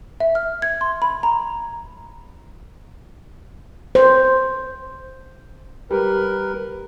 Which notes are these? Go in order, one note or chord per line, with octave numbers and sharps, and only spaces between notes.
E5
F6
G#6
C6
B5
A#5
C5
G3 A#4 B4